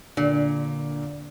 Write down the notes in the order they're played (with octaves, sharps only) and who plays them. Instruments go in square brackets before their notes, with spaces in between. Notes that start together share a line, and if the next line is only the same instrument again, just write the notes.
[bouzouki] A#2 [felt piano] D3